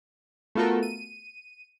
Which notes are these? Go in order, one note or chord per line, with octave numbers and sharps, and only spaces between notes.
A3 B3 F4 F#4 A4 A#4
D#7